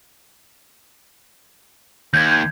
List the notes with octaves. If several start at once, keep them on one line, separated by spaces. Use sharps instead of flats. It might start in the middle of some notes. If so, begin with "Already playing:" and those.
D#2 G6 G#6